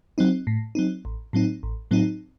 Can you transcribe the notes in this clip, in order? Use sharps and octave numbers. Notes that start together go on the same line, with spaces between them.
F#3 C4 D#4
A2
F#3 C4 D#4
A1
A2 F#3 C4 D#4
A1
A2 F#3 C4 D#4